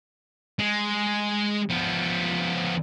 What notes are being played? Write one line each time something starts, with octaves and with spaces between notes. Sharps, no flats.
G#3
F3 B3